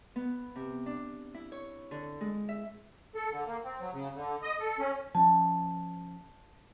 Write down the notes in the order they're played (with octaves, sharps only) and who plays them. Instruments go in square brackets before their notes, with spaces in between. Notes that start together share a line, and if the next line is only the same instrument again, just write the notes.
[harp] B3
C3
D4
E4
C#5
D3
G#3
E5
[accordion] A4
D3
A#3
C4
F#3
C#3
D3
D#5
A4
C#4
[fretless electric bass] F3 C#4 [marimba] A5